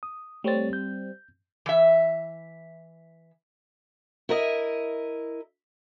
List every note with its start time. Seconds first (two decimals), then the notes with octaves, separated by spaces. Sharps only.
0.03 D#6
0.44 G3 A3 C4 C#5 A6
0.73 G6
1.66 E3 E5
4.29 E4 A#4 D#5